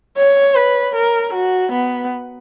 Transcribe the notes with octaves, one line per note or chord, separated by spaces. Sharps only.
C#5
B4
A#4
F#4
B3